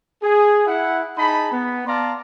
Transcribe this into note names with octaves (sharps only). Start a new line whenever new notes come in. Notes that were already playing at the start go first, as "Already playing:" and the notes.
G#4
E4 F#5
D#4 G#4 A5 B5
B3
D5 F5 A5 A#5 C6